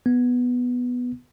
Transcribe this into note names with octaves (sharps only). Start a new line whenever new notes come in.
B3